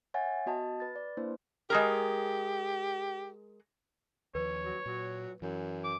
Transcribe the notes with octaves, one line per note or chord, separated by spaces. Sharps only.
C#5 E5 F#5 G#5 A6
B3 F#4 D#5 A5
B4 A6
D5
A#3 D4 E4 B4 C5
G#3 G4 G#4 A#4
D#2 F3 B4 C#5
F#3
A#2 F#3
F#2 E3
D6